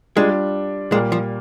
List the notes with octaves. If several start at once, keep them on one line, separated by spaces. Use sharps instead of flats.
G3 G#3 D4 F4
A#2 G3 G#3 A#3
F3